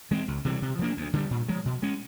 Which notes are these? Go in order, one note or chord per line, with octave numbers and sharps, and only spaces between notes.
E3 G#3 C4
C#2
C3 E3 G3
C3
F3 A#3 D4
D2
D3 G3
A#2
F3 G#3
B2
G#3 C#4